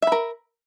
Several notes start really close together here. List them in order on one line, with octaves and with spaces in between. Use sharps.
E5 B5 A#4